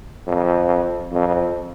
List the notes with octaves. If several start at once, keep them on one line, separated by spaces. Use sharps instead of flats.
F2
F2